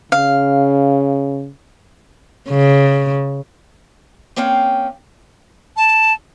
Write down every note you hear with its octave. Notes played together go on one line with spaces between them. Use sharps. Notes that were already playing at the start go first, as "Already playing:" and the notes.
C#3 F5
C#3
A#3 C4 C#4 F5 G5
A5